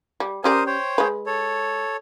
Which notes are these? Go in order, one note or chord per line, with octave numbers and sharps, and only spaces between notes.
G3
C#4 G4 A#4 C5 D5 D#6
C5 C#5 G5
G#3 B4
A4 C#5